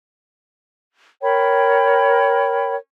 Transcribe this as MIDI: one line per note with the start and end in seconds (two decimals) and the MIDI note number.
1.22 2.75 70
1.22 2.75 73
1.22 2.75 79
1.22 2.75 83